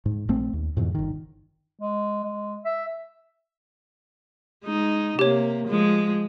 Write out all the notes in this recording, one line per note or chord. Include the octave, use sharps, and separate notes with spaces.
G#2
A#1 A3 C4
D#2
F2 G#2 B2 E3
G1 D#3
G#3
G#3
E5
G#3 D#4
C3 A#3 G4 C#5
F3 G#3